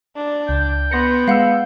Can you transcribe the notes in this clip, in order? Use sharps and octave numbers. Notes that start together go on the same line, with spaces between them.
D4
C#2 G5
B3 C6 A#6 C#7
G#3 F5 F#5 E6